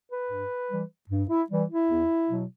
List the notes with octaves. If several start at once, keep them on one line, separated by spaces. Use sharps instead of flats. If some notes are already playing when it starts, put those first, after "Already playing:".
B4
G2
E3 G3
G2
E4
E3 G3
E4
E2
B2 F#3